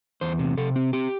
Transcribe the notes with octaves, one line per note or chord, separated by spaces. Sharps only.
E2 C5
C3
C3 A4
C4
C4 G4